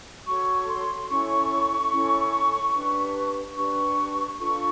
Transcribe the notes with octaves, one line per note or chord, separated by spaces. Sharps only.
F#4 A4 C#5 C#6
C6
C#4 E4 A4 C#5 C#6
C#4 E4 A4 C#5
D4 G4 B4
D4 G4 B4 C#6
D4 F4 A4 C#6